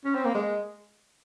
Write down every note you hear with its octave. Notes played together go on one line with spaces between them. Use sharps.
C#4
C4
A#3
G#3